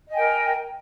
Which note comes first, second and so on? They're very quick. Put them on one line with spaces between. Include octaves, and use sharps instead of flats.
D#5 G#5 G5 A#4